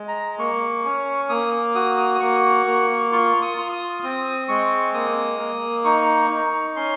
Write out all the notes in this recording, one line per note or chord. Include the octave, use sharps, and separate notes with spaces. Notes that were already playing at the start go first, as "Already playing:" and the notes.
Already playing: G#3
A#5
A#3 C#6
C#4
A#3 D#6
F#4 D#6
D#6
D#6
A#3 C#6
A#3
F4 C#6
D#6
F4
D#6
C4 D#6
G#3 C#6
A#3 D#6
A#3
D#4 C#6
D#4
C#4 C6